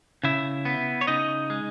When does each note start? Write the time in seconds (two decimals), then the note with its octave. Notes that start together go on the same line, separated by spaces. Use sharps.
0.23 C#3 E4 E5
0.65 B3
1.01 C#5
1.07 C#3 D#4 D#5
1.50 G#3